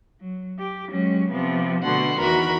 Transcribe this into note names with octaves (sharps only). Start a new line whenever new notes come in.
F#3
G4
F#3 G#3 C#4
C3 F3 B3
B2 D3 A3 F#4 F#5 C6
E2 D#3 E3 F#4 A#4 B5